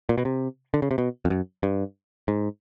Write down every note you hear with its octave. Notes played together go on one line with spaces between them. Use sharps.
A#2
B2
C3
D3
C#3
C3
B2
F2
F#2
G2
G#2